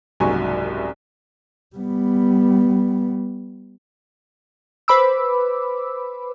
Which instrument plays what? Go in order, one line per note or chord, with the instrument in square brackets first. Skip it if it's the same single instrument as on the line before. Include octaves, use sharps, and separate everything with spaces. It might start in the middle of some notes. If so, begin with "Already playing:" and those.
[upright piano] F#1 C2 G#2 F#3 G#5 C#6
[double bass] G3 B3
[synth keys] B4 C5 B5 D6 E6